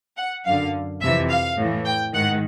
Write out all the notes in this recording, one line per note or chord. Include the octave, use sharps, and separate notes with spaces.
F#5
F#2 F5
D3
F2 C3 E3 E5
F5
A2 E3
G5
G#2 D#3 F#5